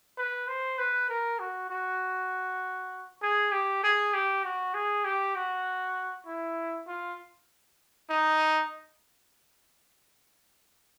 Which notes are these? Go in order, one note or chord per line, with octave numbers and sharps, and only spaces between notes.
B4
C5
B4
A#4
F#4
F#4
G#4
G4
G#4
G4
F#4
G#4
G4
F#4
E4
F4
D#4